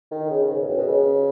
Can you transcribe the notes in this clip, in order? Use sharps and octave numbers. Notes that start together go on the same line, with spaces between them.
D#3
C#3
G#2
E2
F#2
B2
C#3